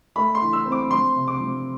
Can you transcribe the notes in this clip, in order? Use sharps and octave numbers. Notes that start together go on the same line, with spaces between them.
A3 B5
C6
E3
E6
C4
D6
F3 C6
C3
D6
F3